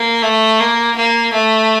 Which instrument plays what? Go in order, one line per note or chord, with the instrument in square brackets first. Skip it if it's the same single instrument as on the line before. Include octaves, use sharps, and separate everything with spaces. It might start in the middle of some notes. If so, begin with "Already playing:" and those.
Already playing: [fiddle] A#3
A3
A#3
A#3
A3